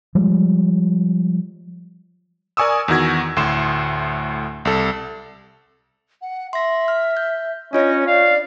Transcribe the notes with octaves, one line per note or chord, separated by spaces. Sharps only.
F3 G3 G#3
A#4 D5 G#5 C#6 D#6 E6
E2 D#3 F#4 G#6
D2 A2 C6 E7
C2 A4
F#5
E5 C6 A#6
F6
G6
C#4 D4 F4 C#5 D#5
D5 F5